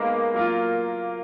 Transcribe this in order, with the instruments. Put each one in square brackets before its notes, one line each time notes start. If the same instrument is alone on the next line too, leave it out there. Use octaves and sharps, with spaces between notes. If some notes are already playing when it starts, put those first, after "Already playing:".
Already playing: [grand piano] G#3 B3 D#4 [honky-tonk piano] A#3
[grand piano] F#3 A#3 F4